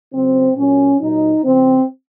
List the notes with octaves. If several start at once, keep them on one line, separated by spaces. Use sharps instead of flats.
C#3 F#3 C4
A#2 F#3 C#4
A#2 F#3 D#4
C#3 F3 C4